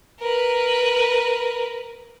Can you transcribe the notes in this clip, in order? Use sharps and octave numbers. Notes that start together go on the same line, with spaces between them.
A#4 B4